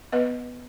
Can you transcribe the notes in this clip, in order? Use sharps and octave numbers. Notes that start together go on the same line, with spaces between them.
B3 B4 D#5